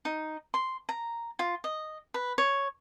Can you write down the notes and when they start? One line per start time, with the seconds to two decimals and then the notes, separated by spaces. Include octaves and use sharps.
0.05 D#4
0.54 C6
0.89 A#5
1.39 F4
1.64 D#5
2.14 B4
2.38 C#5